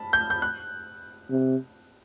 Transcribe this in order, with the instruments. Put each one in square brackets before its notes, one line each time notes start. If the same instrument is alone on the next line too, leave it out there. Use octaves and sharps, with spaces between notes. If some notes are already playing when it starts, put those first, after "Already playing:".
Already playing: [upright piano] A5 B5
G6
G6
F#6
[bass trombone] C3